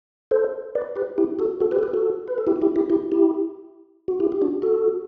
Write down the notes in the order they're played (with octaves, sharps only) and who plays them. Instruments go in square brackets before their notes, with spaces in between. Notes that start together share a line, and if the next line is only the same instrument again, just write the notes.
[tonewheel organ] A4 C5
B4 D5
G4 B4
E4 G4
F#4 A4
F#4 A4
G4 B4
A4
G4 B4
F#4 A4
B4
A4
E4 G4
F#4
E4 G4
E4 G4
E4 G4
E4 G4
F#4
E4 G4
G4
D4 F#4
F#4 A4